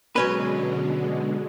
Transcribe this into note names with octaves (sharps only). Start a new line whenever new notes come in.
B2 D3 F#3 G#3 C#4 B4